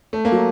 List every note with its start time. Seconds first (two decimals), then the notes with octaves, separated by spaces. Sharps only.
0.13 A3
0.25 A#3
0.32 F#3